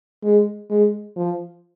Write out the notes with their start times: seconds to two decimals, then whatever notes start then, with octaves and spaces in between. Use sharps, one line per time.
0.24 G#3
0.70 G#3
1.17 F3